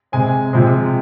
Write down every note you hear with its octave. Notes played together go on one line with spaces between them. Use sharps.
C3 G#3 C4 G#5
C3 F3 G#3 C4